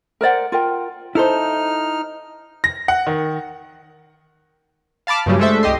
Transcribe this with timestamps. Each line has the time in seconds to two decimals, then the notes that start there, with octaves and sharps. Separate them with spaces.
0.21 A#4 C5 D5 F#5
0.52 F4 A#4 G5
1.15 D#4 E4 A4 C5 F6
2.64 A#6
2.88 F#5
3.07 D#3
5.07 F5 A5 B5 D6 F6
5.26 G2 A#2 C#3 F#3 G3
5.39 G#3 A3 D4 A4 C5 E5
5.63 C2 G4 D#5 C6